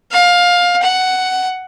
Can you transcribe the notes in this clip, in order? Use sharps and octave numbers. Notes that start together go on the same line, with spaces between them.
F5
F#5